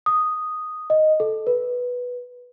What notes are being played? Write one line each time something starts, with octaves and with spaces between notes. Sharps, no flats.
D#6
D#5
A4
B4